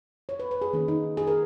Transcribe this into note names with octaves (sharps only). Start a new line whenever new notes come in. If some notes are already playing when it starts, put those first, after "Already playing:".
C#5
B4
B4
G#4
D#3 A#3 C#4
D#4
G#4
A#4